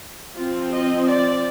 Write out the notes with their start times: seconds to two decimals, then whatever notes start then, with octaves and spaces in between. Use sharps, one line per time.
0.36 F3 C4 F4
0.71 D#5
1.07 D5